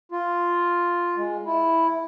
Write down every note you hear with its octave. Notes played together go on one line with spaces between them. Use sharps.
F4
G#3
E4